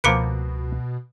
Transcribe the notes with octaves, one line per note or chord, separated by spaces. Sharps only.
C#2 B2 F3 A#3 B4 D6 C#7 D7